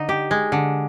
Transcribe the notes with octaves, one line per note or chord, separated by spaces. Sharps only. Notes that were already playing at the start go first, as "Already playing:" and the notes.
Already playing: D3 D#4
G4
G#3
D3